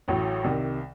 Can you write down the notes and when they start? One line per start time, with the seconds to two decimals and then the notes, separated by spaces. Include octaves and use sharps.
0.08 A1 A2 F#3
0.44 C2 C3 D#3